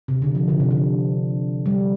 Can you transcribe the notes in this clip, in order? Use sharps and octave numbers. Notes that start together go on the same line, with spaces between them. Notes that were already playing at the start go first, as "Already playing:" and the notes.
C3
D3
F3
D3
C3
D3
G3